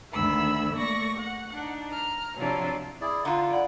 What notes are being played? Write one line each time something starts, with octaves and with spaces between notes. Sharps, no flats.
D2 D#3 E5 B5 E6
A3 A#3 D5 C#6 A#6
F#5
D4 D#4
A#5 F6
C3 F3 F#3 D4 E4 F4
E4 G#4 D5
D3 F4 F#5 A#5
E4 D5 F#5